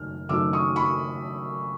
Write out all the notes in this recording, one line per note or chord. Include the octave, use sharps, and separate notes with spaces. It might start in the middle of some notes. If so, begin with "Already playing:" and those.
Already playing: F#1 F#2 D#3 F#3 A3 F6
F#1 F#2 D#3 F#3 A3 D6 E6
C#6 D#6
B5 C#6